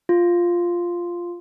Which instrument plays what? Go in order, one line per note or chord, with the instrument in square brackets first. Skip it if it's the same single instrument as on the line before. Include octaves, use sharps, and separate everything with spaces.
[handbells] F4